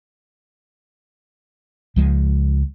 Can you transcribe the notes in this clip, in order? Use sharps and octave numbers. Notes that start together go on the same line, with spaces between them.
C#2 F3 G#3